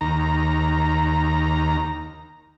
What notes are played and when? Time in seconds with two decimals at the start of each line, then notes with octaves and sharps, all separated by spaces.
0.01 D#2 A#5